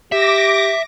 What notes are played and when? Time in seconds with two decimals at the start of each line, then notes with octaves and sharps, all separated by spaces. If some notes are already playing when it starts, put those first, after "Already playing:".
0.12 G4 E5 D6 A#6